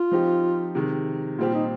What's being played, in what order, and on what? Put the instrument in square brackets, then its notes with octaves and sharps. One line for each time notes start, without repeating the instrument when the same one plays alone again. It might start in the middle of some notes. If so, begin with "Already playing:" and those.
Already playing: [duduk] F4
[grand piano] F3 C4 D#4 G4
C3 D#3 G#3
[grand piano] A#2 G3 C4 G4 [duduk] F4
[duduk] D#4